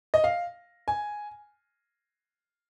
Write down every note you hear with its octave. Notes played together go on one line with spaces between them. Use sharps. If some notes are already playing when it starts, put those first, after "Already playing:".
D#5
F5
G#5